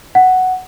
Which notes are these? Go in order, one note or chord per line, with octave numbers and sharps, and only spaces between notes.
F#5